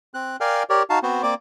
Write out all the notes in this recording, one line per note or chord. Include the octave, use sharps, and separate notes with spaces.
C4 F#6
A#4 D5 F5 G5 G#5 F6
G4 A#4 C#5 D5
D#4 F#4 F5 A5
B3 C4 F#4 C5
A#3 C4 D5 D6